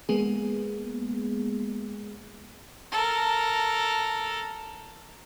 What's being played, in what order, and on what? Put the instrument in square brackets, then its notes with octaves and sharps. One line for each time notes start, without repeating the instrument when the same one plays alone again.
[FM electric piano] G#3 A#3 B3 G#4
[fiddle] A4 A#4